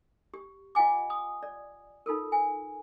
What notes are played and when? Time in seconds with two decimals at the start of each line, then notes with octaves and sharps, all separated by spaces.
0.34 G4
0.75 F4 D#5 F#5 G#5 D6
1.10 D#6
1.43 D5
2.06 D#4 F4 A4 A#4
2.32 G#5